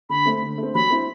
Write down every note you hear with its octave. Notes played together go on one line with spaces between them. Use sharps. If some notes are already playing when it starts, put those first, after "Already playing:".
D3 B5
A3 C4
D3
A3
C4
F#3 B5
C4 E4